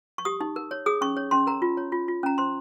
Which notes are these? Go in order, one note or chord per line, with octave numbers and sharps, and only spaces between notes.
C#6
G4 D#6
D#4
A#4
C#5
G#4 D#6
C#4 C#6
C#5
C#4 C6
A#4 A#5
F4
C#5
F4
F4
C#4 A#5
C5 C6